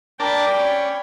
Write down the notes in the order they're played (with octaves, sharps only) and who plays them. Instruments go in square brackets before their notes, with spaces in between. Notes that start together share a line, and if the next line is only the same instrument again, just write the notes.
[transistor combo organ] D4 A#4 A5 [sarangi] D5 [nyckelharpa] G5 B5
[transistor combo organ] C#4